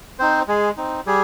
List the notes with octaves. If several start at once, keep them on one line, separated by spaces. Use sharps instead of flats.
C4 D#4 C5
G#3 G#4
C4 D#4
G3 G#4